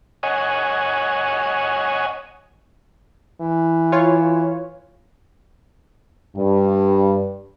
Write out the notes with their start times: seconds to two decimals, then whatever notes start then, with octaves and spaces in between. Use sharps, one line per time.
0.23 C#5 D#5 F#5 G#5
3.41 E3
3.92 F4 C#5
6.36 G2